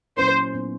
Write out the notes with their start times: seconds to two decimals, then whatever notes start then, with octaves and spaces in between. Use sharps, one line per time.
0.17 A#2 F#3 A#3 C#4 E4 C5
0.54 A#2 F#3 B3 D#4